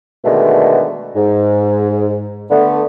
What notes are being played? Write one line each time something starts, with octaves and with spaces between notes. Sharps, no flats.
B2 D3 D#3 G#3 A3
G#2
D3 A3 B3